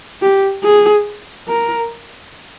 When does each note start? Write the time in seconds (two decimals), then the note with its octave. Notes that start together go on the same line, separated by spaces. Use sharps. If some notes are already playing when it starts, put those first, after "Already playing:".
0.22 G4
0.64 G#4
1.48 A#4